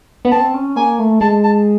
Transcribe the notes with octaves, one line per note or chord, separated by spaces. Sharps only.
B3
C4 A5
C#4
A#3 G#5
A3
G#3 A5
A5